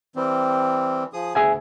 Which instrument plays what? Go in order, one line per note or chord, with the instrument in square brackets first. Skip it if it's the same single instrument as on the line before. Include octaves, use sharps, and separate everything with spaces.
[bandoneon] E3 G3 C4
F3 G#4 D#6
[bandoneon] D2 [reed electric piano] G#4 E5 G#5